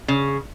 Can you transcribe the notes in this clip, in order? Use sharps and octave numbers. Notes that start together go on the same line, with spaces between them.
C#3